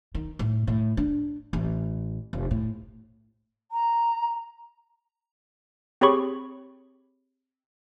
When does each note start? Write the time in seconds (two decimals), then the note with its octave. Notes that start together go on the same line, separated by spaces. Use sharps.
0.15 D#3
0.39 A2
0.67 A2
0.97 D4
1.53 A1
2.33 F1
2.51 A2
3.72 A#5
6.01 C4 G4 G#4 C#5 B5 C#6